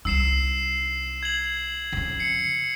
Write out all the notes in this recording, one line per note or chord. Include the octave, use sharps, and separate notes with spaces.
C2 D#4 E6 C7 E7
G#6 F#7
F2 C#3
C7 C#7